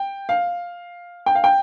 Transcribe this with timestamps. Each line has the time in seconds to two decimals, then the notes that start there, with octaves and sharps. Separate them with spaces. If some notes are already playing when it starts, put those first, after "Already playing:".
Already playing: G5
0.29 F5
1.26 G5
1.35 F5
1.44 G5